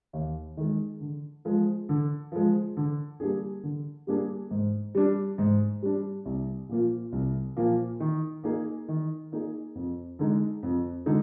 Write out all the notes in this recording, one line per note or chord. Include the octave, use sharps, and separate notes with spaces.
D#2
D#3 G#3
D3
F3 G#3
D3
F3 G#3
D3
G3 A#3 D4 G#4
D3
G3 A#3 D4 G#4
G#2
G3 D4
G#2
G3 D4
C2
A#2 F3 A#3 F4
C2
A#2 F3 A#3 F4
D#3
A#3 D#4 G#4
D#3
A#3 D#4 G#4
F2
D3 G#3 D#4
F2
D3 G#3 D#4